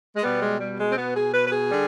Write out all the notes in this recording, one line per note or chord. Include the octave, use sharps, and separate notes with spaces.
G#3
B2 G3 B3
G#3
G3
G#3
C4
B3
G#4
B4
B4
G#4
D3 G3